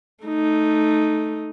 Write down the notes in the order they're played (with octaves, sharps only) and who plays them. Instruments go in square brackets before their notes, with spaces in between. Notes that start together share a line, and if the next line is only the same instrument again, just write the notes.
[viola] A3 D#4